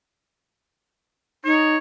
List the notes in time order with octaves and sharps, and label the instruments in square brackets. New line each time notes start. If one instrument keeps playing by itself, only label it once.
[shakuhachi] D#4 [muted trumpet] C#5